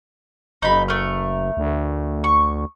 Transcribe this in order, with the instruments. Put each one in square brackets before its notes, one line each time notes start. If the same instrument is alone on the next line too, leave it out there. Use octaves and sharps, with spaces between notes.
[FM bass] F#1 [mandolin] D#4 B5
[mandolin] A3 A#4
[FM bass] D2
[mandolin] C#6